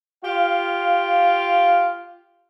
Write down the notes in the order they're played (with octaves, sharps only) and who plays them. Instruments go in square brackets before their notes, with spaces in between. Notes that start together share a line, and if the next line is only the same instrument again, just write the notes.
[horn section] F4 G4 F5